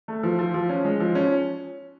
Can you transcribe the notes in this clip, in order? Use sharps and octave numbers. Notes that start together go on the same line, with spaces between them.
A3
F3
F3
F3
C#4
G#3
F3
C#4